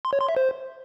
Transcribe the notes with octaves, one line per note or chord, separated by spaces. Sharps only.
C6
C#5
C6
E5
C5